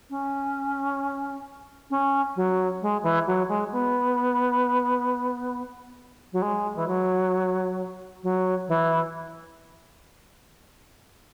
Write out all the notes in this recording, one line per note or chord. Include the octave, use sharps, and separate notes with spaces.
C#4
C#4
F#3
G#3
E3
F#3
G#3
B3
F#3
G#3
E3
F#3
F#3
E3